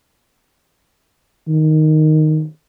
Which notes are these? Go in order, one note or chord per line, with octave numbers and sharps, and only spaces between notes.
D#3